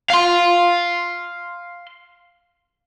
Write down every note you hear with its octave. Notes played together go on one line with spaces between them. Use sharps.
F5 C6